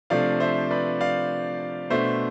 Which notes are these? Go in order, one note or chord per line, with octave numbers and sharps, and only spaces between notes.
C3 F3 A3 D4 D5 F5
C5 E5
B4 D5
D5 F5
B2 A3 D4 C5 E5